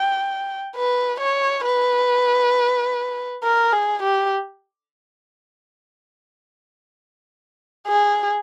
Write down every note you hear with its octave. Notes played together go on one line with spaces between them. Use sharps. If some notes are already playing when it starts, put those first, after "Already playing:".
Already playing: G5
B4
C#5
B4
A#4
G#4
G4
G#4